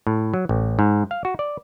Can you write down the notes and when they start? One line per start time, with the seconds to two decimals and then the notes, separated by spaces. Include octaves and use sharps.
0.07 A2
0.34 F#3
0.49 A1
0.79 G#2
1.11 F5
1.25 F#4
1.39 D5